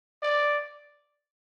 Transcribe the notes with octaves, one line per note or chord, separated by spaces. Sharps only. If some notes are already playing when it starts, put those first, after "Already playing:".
D5